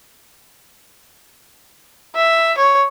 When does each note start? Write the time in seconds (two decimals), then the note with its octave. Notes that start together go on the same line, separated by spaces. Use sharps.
2.16 E5
2.58 C#5